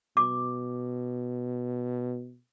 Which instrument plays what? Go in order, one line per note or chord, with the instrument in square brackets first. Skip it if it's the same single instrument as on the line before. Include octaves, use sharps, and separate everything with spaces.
[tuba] B2 [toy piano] D6